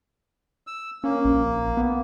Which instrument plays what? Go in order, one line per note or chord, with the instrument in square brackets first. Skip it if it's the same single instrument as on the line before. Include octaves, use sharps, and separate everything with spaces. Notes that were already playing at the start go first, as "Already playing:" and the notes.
[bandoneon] E6
[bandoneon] A#3 [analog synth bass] C#4
[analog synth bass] A#1
B3